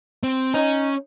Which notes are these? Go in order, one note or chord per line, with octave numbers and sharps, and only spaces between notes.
C4
C#4 D#4